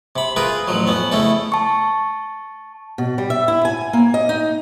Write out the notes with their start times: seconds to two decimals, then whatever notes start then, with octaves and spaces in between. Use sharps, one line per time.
0.16 C3 B5
0.36 F4 G#4 A#4 B4 G#5
0.68 A1 F3 F#3
0.87 F2 B3 C#4
1.12 C#3 A3 C#4 E4 A4
1.52 A5 C#6
2.98 B2
3.18 G3
3.30 E5
3.48 E4
3.65 G#5
3.93 A#3
4.14 D#5
4.29 D#4